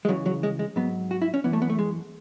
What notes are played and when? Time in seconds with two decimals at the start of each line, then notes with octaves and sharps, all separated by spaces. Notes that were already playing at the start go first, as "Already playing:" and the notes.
0.05 G#3
0.09 C#2 C#3 E3 F#3
0.26 F#3
0.43 G#3
0.59 G#3
0.76 G#2 F#3 B3
1.11 F#4
1.22 E4
1.34 C#4
1.44 F#2 E3 B3
1.53 A3
1.62 B3
1.70 A3
1.79 G#3